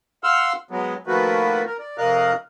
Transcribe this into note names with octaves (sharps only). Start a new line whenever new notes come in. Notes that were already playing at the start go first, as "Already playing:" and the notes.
F5 F#5 C6 E6 F6
F#3 G#3 B3
D#3 F3 A3 A#3 F#4 B4
A#4
D5
F2 C3 A#4 D#5 F5 F#6